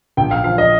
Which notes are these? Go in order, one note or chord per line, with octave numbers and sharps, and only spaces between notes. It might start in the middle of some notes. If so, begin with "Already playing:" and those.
A#1 G5
F5
F3 F5
D#5